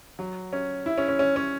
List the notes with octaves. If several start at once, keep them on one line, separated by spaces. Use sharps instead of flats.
F#3
C#4
E4
C#4
C#4
C#4
C#4